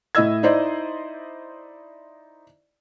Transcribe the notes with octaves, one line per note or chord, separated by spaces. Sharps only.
A2 E4 D#5 E6 G#6
D#4 E4 C5 D5 D#5